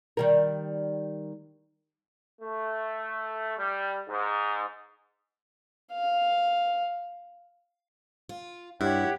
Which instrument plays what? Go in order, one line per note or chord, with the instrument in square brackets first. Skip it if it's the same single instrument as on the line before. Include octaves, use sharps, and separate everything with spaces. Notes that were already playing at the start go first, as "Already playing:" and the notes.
[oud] D#3 G3 A#4
[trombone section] A3
G3
G#2
[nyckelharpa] F5
[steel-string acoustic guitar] F4
[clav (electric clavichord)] G2 [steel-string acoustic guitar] E4 [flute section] G4 C#5 [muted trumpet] F#5